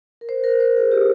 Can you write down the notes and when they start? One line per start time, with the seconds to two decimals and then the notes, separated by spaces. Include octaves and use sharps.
0.21 A#4
0.29 C5
0.44 A#4
0.60 C5
0.76 G#4
0.92 G4